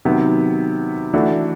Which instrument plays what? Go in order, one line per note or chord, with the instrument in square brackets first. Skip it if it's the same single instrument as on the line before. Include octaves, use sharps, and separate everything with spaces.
[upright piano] C3 D#3 F#3 B3
E3 A3 D4 F#4 A4